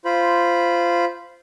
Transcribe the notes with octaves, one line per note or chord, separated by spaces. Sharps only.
F4 C5 B5